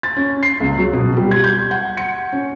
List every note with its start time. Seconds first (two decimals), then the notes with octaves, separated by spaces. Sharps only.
0.03 A6
0.17 C#4
0.43 C7
0.60 C#2
0.78 F#3
0.93 B2
1.17 G3
1.31 G#6
1.44 G6
1.71 F#5
1.97 C#7
2.33 C#4